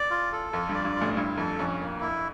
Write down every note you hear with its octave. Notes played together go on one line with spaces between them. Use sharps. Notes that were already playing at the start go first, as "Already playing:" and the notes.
Already playing: A1 D5
F4
A4
F2 F4
G2 D5
G2
F4
A1 A2
G2 E4
F2 A4
F2 C#4
A#3
E4